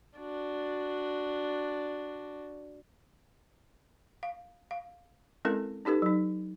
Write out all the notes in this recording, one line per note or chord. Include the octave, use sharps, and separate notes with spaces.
D4 F#4
F5
F5
G#3 C4 C#4 E4 A4 A#4
C#4 D#4 G4 A4 B4
F#3 D#4